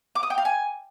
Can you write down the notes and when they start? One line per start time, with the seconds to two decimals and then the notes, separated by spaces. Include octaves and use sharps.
0.15 D6
0.23 D#6
0.30 G5
0.38 F5
0.45 G#5